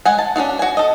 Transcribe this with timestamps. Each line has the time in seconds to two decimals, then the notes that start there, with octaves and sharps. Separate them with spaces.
0.05 G#3 F#5 G#5
0.19 A5
0.36 C#4 D4 F4 F#4
0.59 F#4 G#5
0.77 A4 D#5